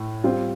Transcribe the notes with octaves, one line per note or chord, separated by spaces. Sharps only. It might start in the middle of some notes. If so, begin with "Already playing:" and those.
Already playing: A2
G3 C4 F4